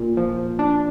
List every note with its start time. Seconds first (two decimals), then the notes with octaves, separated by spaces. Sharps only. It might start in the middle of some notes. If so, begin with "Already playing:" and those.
Already playing: A#2
0.17 F3
0.59 D4